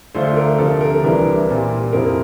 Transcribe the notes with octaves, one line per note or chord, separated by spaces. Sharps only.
D2 D3 A3 D4 F4 C5
A#4
D2 C3 F3 A4
A#4
C2 C3 E3 G3 D4 A#4
A#2 G3 C4
F2 C3 F3 C4 E4 A#4